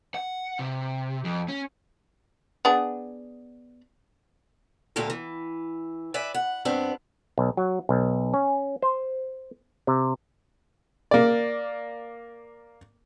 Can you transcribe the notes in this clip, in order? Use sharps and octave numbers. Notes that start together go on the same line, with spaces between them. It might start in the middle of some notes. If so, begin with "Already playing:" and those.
F#5
C3
F2
C#4
B3 D4 G#4
D2 A#2 A#3 G4 A4
E3
B4 D5 E5 G#5
F#5
G2 G3 B3 C4 D4
B1
F#3
B1
C#4
C5
C3
A#3 D5